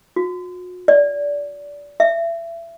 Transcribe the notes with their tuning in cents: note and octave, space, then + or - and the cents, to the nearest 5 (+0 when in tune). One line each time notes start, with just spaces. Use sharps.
F#4 -40
D5 -25
E5 +25